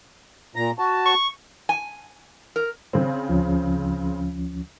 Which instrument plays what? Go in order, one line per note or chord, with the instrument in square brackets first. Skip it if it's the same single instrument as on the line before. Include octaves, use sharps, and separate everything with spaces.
[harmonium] A#2 A#5
F#4 A5
[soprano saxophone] C#6
[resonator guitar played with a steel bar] G#5
A#4
[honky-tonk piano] C#3 C4
[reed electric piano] D2 F3 C#4